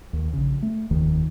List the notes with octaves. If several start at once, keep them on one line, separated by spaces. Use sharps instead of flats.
D#2
A#1 C#3
A3
F1 D#2 D#3